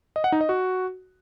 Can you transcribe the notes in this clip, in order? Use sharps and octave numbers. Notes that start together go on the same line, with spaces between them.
D#5
F#5
D#4
D#5
F#4